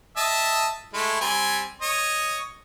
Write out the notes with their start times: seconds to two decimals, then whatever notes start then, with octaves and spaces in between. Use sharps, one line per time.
0.17 D#5 E5 A5
0.94 G#3 A3 E4
1.21 G3 C4 G#5
1.82 C#5 D#5